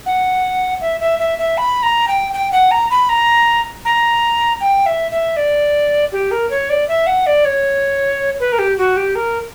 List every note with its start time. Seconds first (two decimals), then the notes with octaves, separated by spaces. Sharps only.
0.06 F#5
0.81 E5
1.00 E5
1.19 E5
1.39 E5
1.58 B5
1.83 A#5
2.08 G5
2.34 G5
2.52 F#5
2.71 A#5
2.90 B5
3.09 A#5
3.85 A#5
4.61 G5
4.86 E5
5.11 E5
5.37 D5
6.12 G4
6.31 A#4
6.50 C#5
6.70 D5
6.88 E5
7.07 F#5
7.26 D5
7.45 C#5
8.40 B4
8.52 A#4
8.59 G4
8.78 F#4
8.97 G4
9.15 A#4